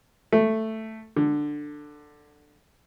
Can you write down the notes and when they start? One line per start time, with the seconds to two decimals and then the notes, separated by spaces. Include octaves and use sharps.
0.33 A3
1.16 D3